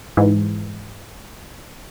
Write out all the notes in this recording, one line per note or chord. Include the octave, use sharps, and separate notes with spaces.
G#2 E3